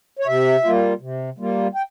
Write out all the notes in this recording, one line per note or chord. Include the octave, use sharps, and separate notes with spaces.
C#5
C3 E5
G3 A#3 F4
C3
G3 A#3 F4
G5